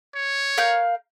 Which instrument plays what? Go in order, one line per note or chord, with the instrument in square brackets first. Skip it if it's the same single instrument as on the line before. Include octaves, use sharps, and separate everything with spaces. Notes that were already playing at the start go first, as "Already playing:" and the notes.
[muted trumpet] C#5
[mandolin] A#4 F5 G6